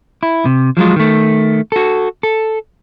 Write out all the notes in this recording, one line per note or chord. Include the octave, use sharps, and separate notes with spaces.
E4
C3
F3 F#3 G#3 F4
D#3 A3
F#4 A4
A4